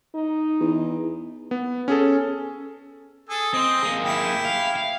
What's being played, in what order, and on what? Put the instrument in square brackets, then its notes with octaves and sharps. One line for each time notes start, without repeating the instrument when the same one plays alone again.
[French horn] D#4
[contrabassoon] E2
[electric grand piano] B3
C#4 G#4 A4
[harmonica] G#4 A4
[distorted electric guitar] C4 C5 [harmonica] D#5
[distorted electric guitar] A#3 G#4
[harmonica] E4 G4
[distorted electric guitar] F5
F5